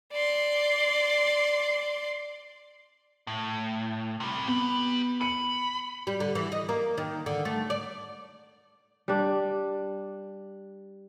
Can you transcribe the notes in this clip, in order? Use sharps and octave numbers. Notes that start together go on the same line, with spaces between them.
D5 C6
A2
C3 G3
B3 G4 B5
B5 C#7 D#7
G3
D3
E3
D#5
A#3
D#3
D3
A3
D5
G3 D4